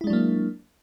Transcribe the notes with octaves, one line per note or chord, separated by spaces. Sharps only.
F#3 G#3 A#3 D4 E4